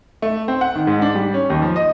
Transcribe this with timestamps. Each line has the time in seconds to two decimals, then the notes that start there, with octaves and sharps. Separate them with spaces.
0.22 A3
0.48 C4
0.61 F#5
0.75 D#3
0.87 G#2
1.02 D4
1.15 G3
1.34 C#4
1.50 D#2
1.62 F3
1.76 D#5